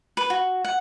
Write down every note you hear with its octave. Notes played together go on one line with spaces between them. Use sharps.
B4
F#4
F#5